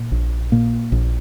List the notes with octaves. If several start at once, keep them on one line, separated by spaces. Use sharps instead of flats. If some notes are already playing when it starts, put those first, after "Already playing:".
Already playing: A#2
A#1
A#2 A#3
A#1